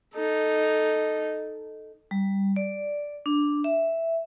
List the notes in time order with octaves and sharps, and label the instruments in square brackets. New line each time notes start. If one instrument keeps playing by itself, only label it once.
[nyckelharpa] D#4 A4
[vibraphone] G3
D5
D4
E5